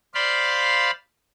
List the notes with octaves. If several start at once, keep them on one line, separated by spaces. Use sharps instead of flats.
C5 D5 F5 B5 C6